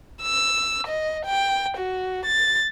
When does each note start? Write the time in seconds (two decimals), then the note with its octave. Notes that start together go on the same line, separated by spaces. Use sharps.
0.23 E6
0.87 D#5
1.25 G5
1.77 F#4
2.26 A6